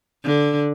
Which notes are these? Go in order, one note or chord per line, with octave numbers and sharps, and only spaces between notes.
D3